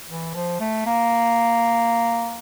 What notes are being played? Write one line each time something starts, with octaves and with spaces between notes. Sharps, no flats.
E3
F3
A3
A#3